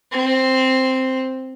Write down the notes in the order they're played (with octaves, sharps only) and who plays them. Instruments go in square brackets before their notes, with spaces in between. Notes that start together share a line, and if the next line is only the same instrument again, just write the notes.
[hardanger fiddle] C4